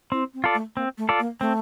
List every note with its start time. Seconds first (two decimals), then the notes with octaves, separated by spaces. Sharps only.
0.12 C4 E4
0.34 C4
0.44 F4 A4 D5
0.54 A3
0.76 A#3 C4
0.98 A3
1.09 F4 A4 D5
1.19 A#3
1.40 A3 C4